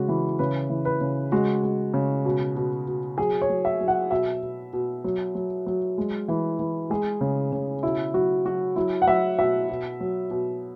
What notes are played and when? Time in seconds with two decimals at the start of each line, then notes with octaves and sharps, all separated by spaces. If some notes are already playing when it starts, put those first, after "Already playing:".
Already playing: C#3 G#3 F#4
0.08 E3
0.39 C#3 B4
0.70 E3
0.85 B4
1.01 C#3
1.32 G#3 F#4
1.63 G#3
1.94 C#3
2.25 B2
2.56 B2
2.88 B2
3.18 F#3 G#4
3.42 C#5
3.50 F#3
3.65 E5
3.80 F#3
3.88 F#5
4.11 B2 E5
4.43 B2
4.73 B2
5.04 F#3
5.35 F#3
5.66 F#3
5.98 G#3
6.28 E3
6.59 E3
6.90 G#3 G#4
7.21 C#3
7.52 C#3
7.83 B2 E4
8.14 F#3 F#4
8.45 F#3 F#4
8.76 F#3 E4
9.02 F#5
9.07 F#3 E5
9.39 B2 E5
9.69 B2
10.00 F#3
10.31 B2